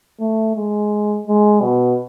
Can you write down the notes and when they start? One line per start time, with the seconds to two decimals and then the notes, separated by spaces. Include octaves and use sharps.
0.20 A3
0.55 G#3
1.27 G#3
1.62 B2